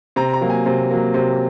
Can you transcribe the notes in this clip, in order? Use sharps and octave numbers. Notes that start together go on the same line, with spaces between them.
C3 A#5
A#5
F#3 A#3
G#5
C3
F#3 A#3
C3